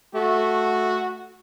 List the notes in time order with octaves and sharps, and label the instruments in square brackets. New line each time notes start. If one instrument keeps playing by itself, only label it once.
[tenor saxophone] A3 [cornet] F#4